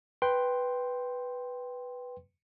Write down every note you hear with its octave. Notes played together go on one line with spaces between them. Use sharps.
B4 G5 C6